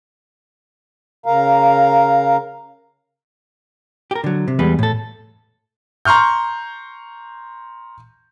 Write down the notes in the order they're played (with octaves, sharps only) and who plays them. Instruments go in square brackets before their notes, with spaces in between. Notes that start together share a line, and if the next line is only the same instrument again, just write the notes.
[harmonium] C#3 A#4 F5 A#5
[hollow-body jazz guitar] G4 A#4
D3 F#3
C3
E2 G3 G#3 B4
A2 A4
[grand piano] A#5 C6 C#6 F6 G6